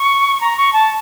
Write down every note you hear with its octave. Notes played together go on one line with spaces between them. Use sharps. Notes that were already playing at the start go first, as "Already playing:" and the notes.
Already playing: C#6
A#5
C#6
A5